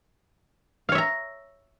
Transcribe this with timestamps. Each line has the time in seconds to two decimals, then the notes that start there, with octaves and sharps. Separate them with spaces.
0.89 F5
0.92 C#5
0.95 E5
0.98 A#5